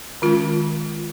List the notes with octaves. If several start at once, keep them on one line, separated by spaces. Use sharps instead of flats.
D#3 G#3 C#4 F4